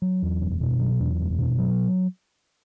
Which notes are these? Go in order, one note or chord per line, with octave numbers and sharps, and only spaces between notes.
F#3
E2
F#1
B2
F#3
E2
F#1
B2
F#3